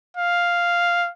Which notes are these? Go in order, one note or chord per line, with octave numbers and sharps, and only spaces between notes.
F5